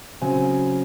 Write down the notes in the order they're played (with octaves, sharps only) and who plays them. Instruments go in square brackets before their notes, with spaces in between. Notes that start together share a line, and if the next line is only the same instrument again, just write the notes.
[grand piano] C#3 F#3 C4 G#5